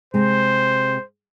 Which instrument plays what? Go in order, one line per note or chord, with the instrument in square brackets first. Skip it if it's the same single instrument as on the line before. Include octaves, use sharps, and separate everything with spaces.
[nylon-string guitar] C3 G#3 [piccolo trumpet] C5